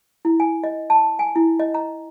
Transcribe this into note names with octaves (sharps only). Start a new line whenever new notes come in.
E4
G#5
D#5
A5
G#5
E4
D#5
A#5